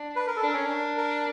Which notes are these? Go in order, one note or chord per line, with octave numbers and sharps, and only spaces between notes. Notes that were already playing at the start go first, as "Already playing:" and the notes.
Already playing: D4
B4
A#4
A4
D4 A#4
C#4
D4
A#4